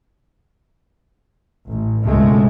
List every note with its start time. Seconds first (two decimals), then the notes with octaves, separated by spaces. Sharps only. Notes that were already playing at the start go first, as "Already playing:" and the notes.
1.70 A1
2.03 C#2 G2 B2 G#3 A3